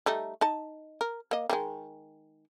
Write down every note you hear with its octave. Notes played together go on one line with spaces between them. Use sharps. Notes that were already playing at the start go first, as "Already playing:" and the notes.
G3 A3 D#4
D#4 D#5 A5
A#4
A#3 D#5
D#3 F3 G#3